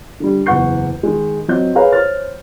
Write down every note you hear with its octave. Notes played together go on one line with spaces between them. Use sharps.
D3 G3
F#1 E2 F#5 C#6 G6 C7
D#3 G#3
F#3 C4 D#5 G6
G#4 A#4 B4 C#5 F5 A#5
C5 C#5 F6 A6